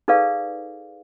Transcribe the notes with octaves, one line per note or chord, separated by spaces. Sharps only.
D#4 G#4 A4 B4 D5 F5